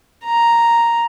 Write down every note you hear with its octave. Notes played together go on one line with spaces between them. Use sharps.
A#5